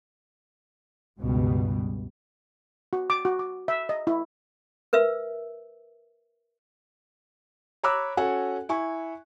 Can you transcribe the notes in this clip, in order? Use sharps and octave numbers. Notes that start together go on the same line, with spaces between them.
C#2 G2 B2 G3
F#4
D6
F#4
D6
E5
D#5
E4
A#4 B4 E5 E6
C#5 A#5 B5 D6 E6 F#6
C#4 F#4 A4 F#5 G#5
E4 G#5 C#6